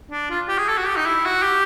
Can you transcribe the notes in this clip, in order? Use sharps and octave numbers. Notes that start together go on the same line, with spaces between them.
D4
F4
G4
G#4
A4
F#4
G4
D#4
E4
F#4
G4